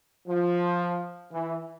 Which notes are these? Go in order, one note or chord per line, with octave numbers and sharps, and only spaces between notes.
F3
E3